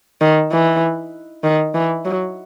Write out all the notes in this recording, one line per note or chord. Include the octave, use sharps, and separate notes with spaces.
D#3
E3
D#3
E3
F#3